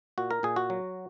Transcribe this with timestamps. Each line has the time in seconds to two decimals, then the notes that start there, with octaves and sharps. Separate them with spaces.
0.18 A#2 F#4
0.31 A#4
0.43 A#2 G#4
0.56 F#4
0.70 F#3